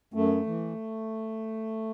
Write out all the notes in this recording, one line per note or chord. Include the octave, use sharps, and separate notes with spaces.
F#2 A3
E3